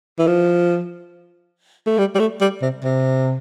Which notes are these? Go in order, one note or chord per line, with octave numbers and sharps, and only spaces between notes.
E3
F3
A3
G3
G3
A3
G3
C3
C3